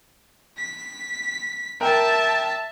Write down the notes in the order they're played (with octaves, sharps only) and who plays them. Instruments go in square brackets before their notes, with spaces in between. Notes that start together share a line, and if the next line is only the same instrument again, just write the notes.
[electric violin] B6
[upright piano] A#4 G5 [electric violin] E5 A5